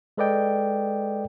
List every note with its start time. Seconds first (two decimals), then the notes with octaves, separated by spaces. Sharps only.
0.17 G#3 A4 B4 D5 D#5 G5